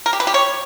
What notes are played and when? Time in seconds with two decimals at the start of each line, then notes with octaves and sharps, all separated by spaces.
0.06 A#4
0.13 G4
0.20 B4
0.27 G4
0.34 C#5